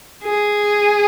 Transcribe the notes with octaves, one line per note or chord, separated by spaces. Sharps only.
G#4